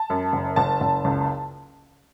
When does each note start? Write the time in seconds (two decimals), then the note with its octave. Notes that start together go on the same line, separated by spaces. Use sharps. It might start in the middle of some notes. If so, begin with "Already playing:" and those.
Already playing: A5
0.10 F#2
0.33 F#1
0.56 F#1 A5
0.81 F#1
1.05 C#2